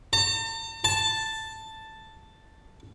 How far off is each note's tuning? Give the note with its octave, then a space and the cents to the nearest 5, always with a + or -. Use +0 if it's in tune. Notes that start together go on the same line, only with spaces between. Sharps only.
A5 +45
A5 +5